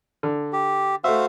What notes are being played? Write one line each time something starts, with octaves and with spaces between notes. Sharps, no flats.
D3
G4
A3 F#4 C5 E5 F5